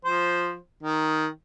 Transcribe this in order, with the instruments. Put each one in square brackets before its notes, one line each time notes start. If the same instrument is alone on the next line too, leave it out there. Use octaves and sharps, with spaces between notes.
[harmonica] F3 C5
D#3